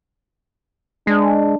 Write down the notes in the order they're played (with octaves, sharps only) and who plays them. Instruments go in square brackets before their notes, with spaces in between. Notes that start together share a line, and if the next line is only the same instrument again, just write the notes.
[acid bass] G#3 [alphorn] D4